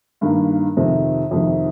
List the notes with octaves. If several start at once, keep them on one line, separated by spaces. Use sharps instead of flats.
G2 D#3 A#3
F2 C3 D#3
F2 C3 D#3